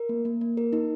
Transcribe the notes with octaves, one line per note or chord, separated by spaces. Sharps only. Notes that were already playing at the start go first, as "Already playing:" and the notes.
Already playing: A#4
A#3
A#3
A#3
A#4
D#4